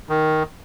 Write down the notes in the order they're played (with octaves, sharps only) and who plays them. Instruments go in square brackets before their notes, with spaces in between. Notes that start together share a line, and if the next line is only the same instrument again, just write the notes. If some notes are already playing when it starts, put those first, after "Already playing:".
[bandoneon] D#3